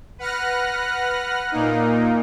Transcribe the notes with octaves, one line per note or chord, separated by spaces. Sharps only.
B4 F#5 F6 F#6 A#6
A#2 A#3 D#4